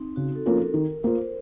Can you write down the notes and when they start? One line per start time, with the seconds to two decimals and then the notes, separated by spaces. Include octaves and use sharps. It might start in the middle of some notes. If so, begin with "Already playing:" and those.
Already playing: C4 D#4
0.16 C#3 F#4
0.35 A4
0.46 F3 A#3 C#4 F4 A#4
0.56 A4
0.74 D#3 A#4
1.03 A#3 F4 C5